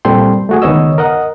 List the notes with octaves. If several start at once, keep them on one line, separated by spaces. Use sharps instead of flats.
A#2 G3 C4 A4 G5 C6
A3 F#4 G#4
C#2 D#3 B3 C#5 D#5 E6
A#4 D#5 F#5